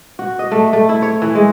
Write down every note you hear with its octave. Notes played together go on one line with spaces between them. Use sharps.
F#4
D#5
A3
A3
E4
C#5
E3
G#3